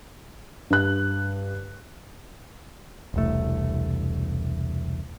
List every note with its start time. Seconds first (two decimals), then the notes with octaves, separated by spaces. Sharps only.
0.70 G2 F#6
3.14 E1 C2 A3